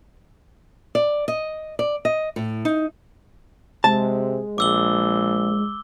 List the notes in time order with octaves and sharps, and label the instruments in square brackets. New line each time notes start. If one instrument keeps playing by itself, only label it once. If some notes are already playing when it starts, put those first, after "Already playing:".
[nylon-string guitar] D5
D#5
D5
D#5
A2
D#4
[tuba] C3 [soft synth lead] G#3 [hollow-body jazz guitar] A5
[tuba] A#1 [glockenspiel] D6 E6 G7